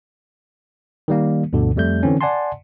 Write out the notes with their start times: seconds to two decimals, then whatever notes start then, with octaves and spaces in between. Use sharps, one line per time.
1.08 D#3 G3 A#3
1.53 D2 G2 B2 D3
1.76 F2 G3 A3 G6
2.03 D3 E3 C4 C#4
2.21 D5 F#5 G#5 A5 C6